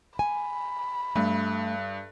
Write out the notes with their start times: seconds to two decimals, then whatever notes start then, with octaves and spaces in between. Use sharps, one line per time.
0.19 G#5 B5
1.16 G2 A3